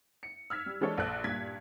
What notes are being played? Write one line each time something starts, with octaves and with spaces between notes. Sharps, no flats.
C#7
E6 F6 G#6 B6
G3
E3 G#3 D4 A4 C#5
A#1 A4 F#6
G2 A#2 G#6 B6